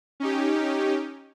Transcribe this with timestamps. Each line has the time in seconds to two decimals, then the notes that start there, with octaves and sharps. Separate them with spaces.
0.20 C#4 D#4 G4